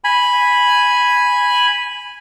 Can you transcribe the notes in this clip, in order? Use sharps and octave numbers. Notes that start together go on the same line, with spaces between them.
G#5 B5